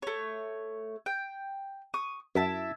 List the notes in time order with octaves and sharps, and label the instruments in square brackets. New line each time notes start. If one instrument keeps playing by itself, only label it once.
[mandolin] A3 C#5
G5
C#6 D#6
[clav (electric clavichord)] F#2 [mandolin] E4 E5 A5